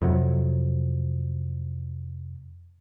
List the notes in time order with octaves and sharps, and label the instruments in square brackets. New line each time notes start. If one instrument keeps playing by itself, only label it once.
[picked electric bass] F2 C3 F#3